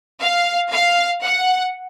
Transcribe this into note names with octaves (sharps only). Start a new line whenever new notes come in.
F5
F5
F#5